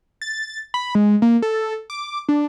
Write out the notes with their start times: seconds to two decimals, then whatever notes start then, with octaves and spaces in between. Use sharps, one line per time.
0.21 A6
0.74 B5
0.95 G#3
1.22 A#3
1.42 A4
1.90 D6
2.29 D4